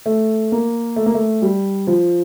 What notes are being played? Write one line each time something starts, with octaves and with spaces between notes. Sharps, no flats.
A3
A#3
A3
A#3
A3
G3
F3